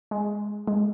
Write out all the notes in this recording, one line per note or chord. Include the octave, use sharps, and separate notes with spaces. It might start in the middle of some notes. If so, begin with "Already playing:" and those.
G#3
G#3